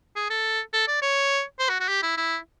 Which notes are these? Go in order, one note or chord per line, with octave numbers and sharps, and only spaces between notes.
G#4
A4
A4
D5
C#5
C5
F#4
F#4
G4
E4
E4